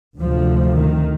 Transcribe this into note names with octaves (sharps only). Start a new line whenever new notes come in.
D2 C3 F3
D#3